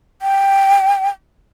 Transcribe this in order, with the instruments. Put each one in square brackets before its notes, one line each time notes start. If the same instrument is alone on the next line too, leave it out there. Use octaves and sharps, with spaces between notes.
[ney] G5